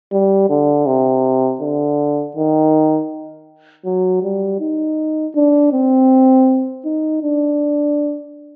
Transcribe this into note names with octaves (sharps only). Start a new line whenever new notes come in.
G3
D3
C3
D3
D#3
F#3
G3
D#4
D4
C4
D#4
D4